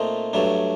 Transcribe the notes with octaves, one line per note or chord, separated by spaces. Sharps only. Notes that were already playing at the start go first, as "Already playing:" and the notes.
Already playing: A#2 A3 C4 D#4
G2 F#3 A3 D4